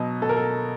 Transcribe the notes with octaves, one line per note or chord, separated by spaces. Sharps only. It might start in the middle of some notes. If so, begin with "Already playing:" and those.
Already playing: B2 F#3 D#5
B2 A4
A#4
A4